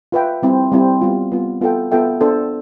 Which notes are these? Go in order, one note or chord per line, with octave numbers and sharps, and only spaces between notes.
F4 B4 E5 G5
G3 C4 E4
G3 C4 E4
G3 B3 F4
G3 B3 F4
B3 F4 A4 E5 G5
B3 F4 A4 E5 G5
B3 D4 A4 C5